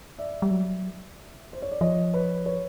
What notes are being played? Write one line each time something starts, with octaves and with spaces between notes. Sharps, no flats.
D5 E5
G3
F#3
C5
C#5
D5
F3 C#5 D#5
B4 C#5
B4 C#5